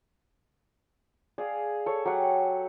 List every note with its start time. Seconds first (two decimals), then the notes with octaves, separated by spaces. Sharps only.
1.38 G#4 D5 F5
1.86 A4 C#5
2.05 F#3 G4 F#5